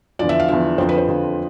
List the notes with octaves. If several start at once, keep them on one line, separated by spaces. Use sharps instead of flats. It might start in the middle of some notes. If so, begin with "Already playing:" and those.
E2 D3 F3 D5
E5
F5
E2 D3 F3 E5
F2 D3 F3 C5
B4
C5
F2 D3 F3